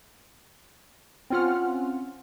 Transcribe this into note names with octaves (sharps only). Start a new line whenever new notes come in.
C4 C#4 F4 F#5 F6